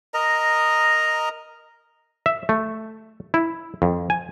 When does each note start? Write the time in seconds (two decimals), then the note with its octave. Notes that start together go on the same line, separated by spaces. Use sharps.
0.14 A#4 D#5 A#5
2.26 E5
2.49 A3
3.34 E4
3.82 F2
4.10 G#5